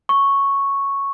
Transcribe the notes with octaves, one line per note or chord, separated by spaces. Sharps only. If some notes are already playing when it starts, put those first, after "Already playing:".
C#6